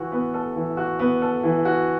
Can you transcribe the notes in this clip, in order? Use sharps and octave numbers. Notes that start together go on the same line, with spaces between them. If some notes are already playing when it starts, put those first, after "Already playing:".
Already playing: E3 F#4
B3
A4
E3
F#4
B3
A4
E3
F#4